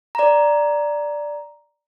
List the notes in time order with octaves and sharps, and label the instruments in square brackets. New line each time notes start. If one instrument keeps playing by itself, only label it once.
[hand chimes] D5 A#5